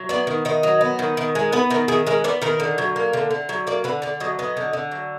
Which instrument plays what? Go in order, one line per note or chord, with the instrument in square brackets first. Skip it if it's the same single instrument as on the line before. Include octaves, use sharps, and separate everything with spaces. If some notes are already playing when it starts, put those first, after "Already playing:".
Already playing: [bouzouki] F#3
B3 D5
D#3
D#3 D#5
F#3
B3
D#3
D#3
G#3
B3 B4
D#3 A#4
D#3 G#4
G#3 A#4
B3 D5
D#3 A#4
D3
F#3
A#3
D3
D3
F#3
A#3 D5
D3 B4
D3 D5
F#3 D#5
B3 D#5
D3
D3
F#3